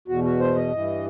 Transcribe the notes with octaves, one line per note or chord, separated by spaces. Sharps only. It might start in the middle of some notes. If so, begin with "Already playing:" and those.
E2 B2 F#4
F#4
C5
D#5
G2 E3